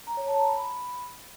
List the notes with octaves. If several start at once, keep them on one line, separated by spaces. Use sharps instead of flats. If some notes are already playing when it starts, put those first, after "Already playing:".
A#5
C#5
A5
A#5
B5